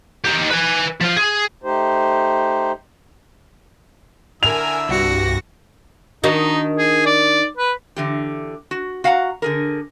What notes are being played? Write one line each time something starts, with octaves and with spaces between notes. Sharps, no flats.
D#4 G4
B4 G#5
F3 F4
G#4
A3 D#4 G4 C5
D3 E4 A#4 G#5 E6 F7
C2 G2 F#4 A#6
D#3 D4 D#4 F#4
G#4
D5
B4
D3 E3 G4
F#4
F#4 F5 F#5 G#5 A#5
D3 G#4 A#4